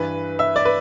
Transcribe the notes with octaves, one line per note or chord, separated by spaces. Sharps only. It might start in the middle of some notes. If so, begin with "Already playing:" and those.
Already playing: G2 E3 B4
E5
D5
B4